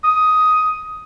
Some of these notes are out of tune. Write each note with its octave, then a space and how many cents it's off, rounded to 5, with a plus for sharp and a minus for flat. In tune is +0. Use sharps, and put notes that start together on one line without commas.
D#6 +10